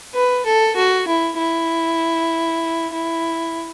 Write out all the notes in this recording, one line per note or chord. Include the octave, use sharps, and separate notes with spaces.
B4
A4
F#4
E4
E4
E4